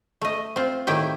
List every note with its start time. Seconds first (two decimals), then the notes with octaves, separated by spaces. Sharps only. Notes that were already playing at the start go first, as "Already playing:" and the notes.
0.21 A3 D#5
0.56 C4 F4
0.87 A2 D#3 E4 G4 G5